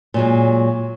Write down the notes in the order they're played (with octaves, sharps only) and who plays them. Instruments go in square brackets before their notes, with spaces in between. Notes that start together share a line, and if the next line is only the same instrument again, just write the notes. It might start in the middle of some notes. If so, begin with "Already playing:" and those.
[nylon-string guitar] A#2 F#3 G#3